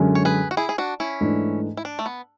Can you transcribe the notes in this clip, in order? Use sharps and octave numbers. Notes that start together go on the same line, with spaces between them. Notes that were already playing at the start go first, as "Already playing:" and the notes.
Already playing: F#2 D3 G#3 C#4
C#5
G#4 B4
F#4
E4 G#4
G#4
D4 F#4
C#4 E4
G#2 E3 A3 D4
E4
D4
A3
B3